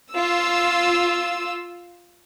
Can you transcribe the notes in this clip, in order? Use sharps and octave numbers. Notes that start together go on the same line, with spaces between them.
F4 E6